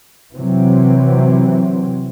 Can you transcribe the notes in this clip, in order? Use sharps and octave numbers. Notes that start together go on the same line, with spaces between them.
C3 E3 F#3 C4